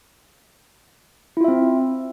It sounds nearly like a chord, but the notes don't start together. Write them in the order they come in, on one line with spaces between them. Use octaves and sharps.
E4 F4 E5 C4